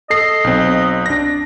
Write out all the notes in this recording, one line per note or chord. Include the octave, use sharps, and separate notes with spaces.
A4 D#5 C7
B1 C4
D4 A#6